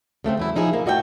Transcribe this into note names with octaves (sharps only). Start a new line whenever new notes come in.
C#3 A3 A#3 C4
E2 F#3 E4
F3 D#4 E4 G#4
A#3
A2 F#4 D#5 E5 G5 A5